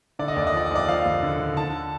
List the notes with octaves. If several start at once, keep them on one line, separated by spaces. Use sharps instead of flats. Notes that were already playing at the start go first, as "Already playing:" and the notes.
D3 D5
D#5
D#2 D5
D#5
F3 D5
D#5
D#2 D5
F3 F5
D#2
D3
D3
D3 A5